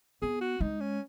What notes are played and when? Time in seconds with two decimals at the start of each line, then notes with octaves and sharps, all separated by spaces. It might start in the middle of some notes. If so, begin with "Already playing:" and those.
0.22 B3 G#4
0.41 F#4
0.61 G#3 D#4
0.81 C#4